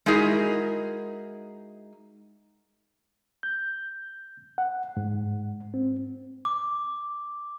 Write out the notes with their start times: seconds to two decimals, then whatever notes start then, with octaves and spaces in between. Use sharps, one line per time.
0.06 G#3 D#4 E4 F#4 G#4 A#4
3.43 G6
4.58 F#5
4.97 G#2
5.74 C4
6.45 D6